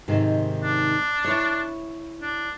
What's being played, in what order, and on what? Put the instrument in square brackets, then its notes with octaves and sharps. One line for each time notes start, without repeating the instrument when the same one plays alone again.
[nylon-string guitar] G#2 C3 D#3
[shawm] D4
[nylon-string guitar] E4 C#5
[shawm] D4